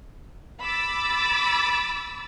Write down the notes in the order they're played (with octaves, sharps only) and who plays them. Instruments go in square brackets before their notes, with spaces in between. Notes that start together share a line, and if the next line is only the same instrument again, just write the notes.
[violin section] B5 D6 E6 A6